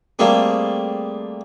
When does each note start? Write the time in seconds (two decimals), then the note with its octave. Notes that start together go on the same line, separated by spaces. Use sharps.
0.19 G3 A3 A#3 C4 G#4